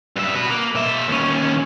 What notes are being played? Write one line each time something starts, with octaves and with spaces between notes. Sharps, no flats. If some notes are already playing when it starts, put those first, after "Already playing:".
G2 E5
F#4 B4
A#3
B2 E5
D#2 C#4